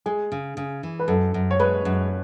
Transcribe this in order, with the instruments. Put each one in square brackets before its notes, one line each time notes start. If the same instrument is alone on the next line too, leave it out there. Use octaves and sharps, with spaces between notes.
[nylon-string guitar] G#3 [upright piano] G#4
[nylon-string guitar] C#3
C#3
E3
[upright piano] B4
[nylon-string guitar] F#2 [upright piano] A4
[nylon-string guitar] F#2
[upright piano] C#5
[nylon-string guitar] G#3 [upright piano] B4
[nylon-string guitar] F#2